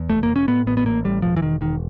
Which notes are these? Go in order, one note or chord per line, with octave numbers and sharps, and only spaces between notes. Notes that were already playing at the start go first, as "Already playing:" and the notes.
Already playing: E2
F1 A3
A#3
F1
C#4
A2 B3
A1 B3
B3
A1 A#3
A2 G3
E1 F3
E3
E1 D#3
E1 D#3